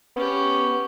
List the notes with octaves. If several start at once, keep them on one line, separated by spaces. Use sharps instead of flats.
B3 C#4 G4